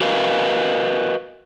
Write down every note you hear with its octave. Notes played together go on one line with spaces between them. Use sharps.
F#4 A#4 B4 D#5 F5